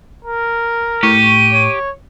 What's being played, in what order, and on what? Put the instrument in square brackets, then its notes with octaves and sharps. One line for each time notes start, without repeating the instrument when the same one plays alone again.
[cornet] A#4
[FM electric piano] A2 C#6 [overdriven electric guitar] G4 [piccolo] D#7
[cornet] C#5